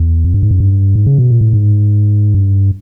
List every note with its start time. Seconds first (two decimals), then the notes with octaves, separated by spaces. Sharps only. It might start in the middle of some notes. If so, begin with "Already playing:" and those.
Already playing: E2
0.24 F2
0.34 G2
0.43 G#2
0.51 F#2
0.60 G2
0.95 G#2
1.06 C#3
1.18 B2
1.30 A#2
1.41 A2
1.53 G#2
2.34 G2